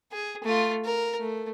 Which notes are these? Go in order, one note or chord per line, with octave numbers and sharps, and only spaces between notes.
G#4
A3 F4
A#4
A3